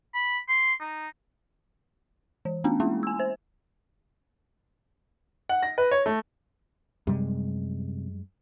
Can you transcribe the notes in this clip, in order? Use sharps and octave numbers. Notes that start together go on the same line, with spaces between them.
B5
C6
D#4
E3
A3 B3 C#4 D4
G#3 A#3 C#4 E4
G#5 E6
C5
F#5
A#6
B4
C#5
A3
F#2 C3 G3 G#3